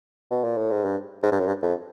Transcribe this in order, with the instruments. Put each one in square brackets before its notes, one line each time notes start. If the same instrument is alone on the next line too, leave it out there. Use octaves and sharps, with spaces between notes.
[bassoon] B2
A#2
A2
G#2
G2
G#2
G2
F#2
G2
F2